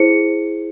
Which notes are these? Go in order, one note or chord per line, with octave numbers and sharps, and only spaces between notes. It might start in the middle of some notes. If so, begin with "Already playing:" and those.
Already playing: E4 G#4 C5 C#7